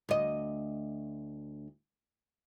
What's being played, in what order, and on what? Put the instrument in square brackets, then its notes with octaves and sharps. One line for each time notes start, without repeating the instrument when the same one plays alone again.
[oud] D2 D#5